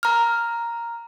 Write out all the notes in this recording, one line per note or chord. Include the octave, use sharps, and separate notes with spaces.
A#5 F6